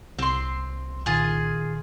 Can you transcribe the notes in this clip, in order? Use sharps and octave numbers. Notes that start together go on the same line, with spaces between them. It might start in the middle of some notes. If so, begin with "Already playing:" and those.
C2 C4 C6
A#2 D#3 F4 G#4